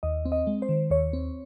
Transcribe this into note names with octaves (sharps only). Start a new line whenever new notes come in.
D#2 D#5
C4
D#5
G#3
C5
D#3
D#2 C#5
C4